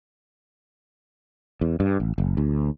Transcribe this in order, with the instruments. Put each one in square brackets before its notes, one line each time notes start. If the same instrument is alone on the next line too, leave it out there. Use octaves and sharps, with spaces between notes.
[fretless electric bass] E2
G2
A1
F#1
D2